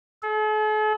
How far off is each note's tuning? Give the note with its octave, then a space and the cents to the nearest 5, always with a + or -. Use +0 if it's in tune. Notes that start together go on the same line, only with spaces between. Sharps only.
A4 -45